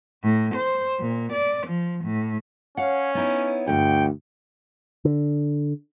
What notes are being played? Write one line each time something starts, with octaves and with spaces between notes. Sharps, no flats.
A2
C5
A#2
D5
F3
A2
C#4 C#5 F5 F#5
B3 D#4 E4
D2 G2 D#3 F#5 G5
D3